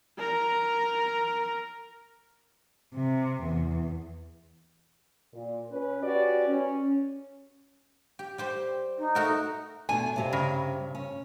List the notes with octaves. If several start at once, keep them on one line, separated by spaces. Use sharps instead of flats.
A#4 A#5
C3
E2
A#2
C#4 B4
C#4 F#4 G4 B4 C#5 D5
C#4
G4
G3 G4 C5
D#4
A3 F#4 A#4
B2 A3 D4 G#5
G2 C3 G3
C#3
C#4